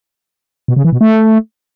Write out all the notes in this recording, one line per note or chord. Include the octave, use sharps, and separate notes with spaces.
B2
C#3
E3
B2
A3